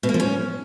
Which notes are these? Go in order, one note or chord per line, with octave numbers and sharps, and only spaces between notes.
B2
A#3
F3
C#4